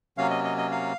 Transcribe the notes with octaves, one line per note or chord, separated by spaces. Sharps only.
C3 F#3 A#3 C#4 F5
D#5
D#5
D#5
F5